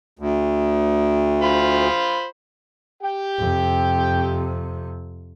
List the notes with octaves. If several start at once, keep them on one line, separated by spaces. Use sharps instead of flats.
D2
F4 C5 B5
G4 G5
F2 C3